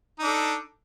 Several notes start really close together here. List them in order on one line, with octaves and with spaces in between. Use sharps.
D#4 D4 A4